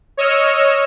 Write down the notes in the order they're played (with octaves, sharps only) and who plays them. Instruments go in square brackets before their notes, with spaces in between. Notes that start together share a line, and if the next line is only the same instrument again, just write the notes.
[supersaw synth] C#5 D#5 E6 F6 C#7